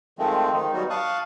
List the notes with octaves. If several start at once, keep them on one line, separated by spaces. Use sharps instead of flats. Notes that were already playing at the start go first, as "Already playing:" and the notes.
D#3 F3 G#3 A3 C4
D#3 D#4
F#3 G3 B3 D#4 F#4
F5 A5 C#6 D#6 F#6